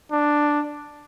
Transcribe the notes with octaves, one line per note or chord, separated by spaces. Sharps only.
D4